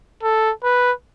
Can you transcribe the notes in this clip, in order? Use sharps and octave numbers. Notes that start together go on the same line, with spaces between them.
A4
B4